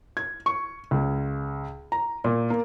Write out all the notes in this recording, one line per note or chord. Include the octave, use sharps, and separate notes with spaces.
G#6
C#6
C#2
A#5
A#2
A#3